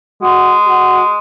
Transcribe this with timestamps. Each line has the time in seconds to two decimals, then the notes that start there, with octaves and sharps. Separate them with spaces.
0.22 G#3 F#4
0.67 F#4